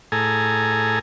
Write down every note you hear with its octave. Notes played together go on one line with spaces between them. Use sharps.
A2 G#4 A4 G#5 A#5